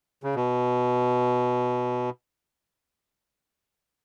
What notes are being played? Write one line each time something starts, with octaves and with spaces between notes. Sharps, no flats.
C#3
B2